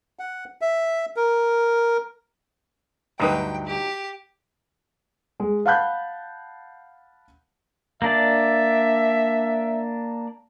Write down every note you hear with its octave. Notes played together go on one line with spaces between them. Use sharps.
F#5
E5
A#4
D2 G2 F#3 D#4 B4 G5
G4
G#3
F5 F#5 A5 B5 F#6 G6
A#3 D4 D5 E5